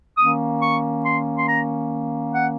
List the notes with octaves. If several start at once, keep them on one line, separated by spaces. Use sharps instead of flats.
D#3 A#3 C#4 D#6
C#6
C6
C6
A#5
F#5